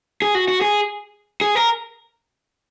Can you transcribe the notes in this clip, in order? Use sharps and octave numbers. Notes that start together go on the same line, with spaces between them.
G#4
F#4
F#4
G#4
G#4
A#4